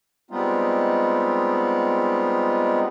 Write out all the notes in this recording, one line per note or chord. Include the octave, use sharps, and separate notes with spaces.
G3 G#3 B3 C4 D#4 F4